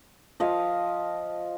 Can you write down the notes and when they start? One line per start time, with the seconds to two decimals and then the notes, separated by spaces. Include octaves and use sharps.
0.40 F3 D#5 F5